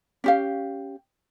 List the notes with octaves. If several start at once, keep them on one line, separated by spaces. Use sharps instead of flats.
C#4 G4 F5